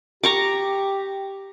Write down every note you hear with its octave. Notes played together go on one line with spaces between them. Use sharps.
G4 A#5 C#6 D6